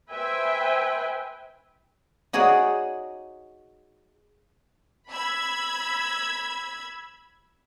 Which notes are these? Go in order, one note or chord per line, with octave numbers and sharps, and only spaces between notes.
B4 C5 E5 G5 G#5
D#4 F#4 G#4 C#5 D5 F#5
B5 E6 G#6